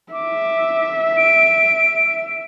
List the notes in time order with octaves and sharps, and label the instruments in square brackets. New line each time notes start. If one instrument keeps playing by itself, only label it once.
[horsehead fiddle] E5 [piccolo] D6
[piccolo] D7